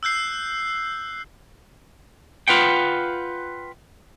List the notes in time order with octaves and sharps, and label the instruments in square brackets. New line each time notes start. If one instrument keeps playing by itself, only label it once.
[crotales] E6 F#6 G6 C7
[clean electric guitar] F4 B4 F#5 G5